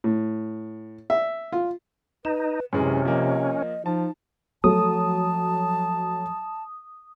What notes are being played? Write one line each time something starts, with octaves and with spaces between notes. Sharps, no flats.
A2
E5
F4
D#4 B4 E7
F#2 C3 E3 G#3 C#4 C#5
F3 A#3 D#5
F3 D#4 A5
F3 F#3 A3 A5 D#6